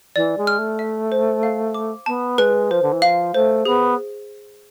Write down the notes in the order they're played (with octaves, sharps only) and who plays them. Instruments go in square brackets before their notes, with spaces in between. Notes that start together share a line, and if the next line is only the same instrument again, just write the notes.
[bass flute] E3 [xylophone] D5
[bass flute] G#3
[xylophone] F6
[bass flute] A3
[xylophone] E5
C5
F5
D6
[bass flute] B3 [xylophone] A5
[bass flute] G#3 [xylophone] B4
[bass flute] F3 [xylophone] C5
[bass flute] D3
E3
[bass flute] F3 [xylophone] F5
[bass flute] A3 [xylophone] C5
[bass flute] B3 [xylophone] G#4